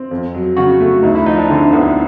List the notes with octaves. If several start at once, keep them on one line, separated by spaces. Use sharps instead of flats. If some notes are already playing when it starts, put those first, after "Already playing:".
Already playing: C4
F2
F#3
C#3 F#4
A3
D2 D#4
E4
F3 D#4
D4
D3 C4
D2 B3